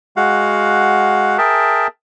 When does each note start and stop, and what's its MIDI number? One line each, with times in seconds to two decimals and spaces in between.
0.17 1.37 56
0.17 1.37 66
0.17 1.37 77
0.17 1.37 78
1.38 1.87 68
1.38 1.87 70
1.38 1.87 76
1.38 1.87 79
1.38 1.87 81